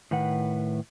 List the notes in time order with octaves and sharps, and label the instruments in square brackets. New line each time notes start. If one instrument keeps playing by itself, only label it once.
[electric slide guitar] A2 D#3 B4 F#5